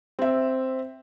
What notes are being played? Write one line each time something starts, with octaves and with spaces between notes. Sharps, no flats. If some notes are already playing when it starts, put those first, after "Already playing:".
C4 E5